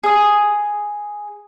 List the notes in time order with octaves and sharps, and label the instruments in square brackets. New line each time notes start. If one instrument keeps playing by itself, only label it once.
[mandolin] G#4 D#6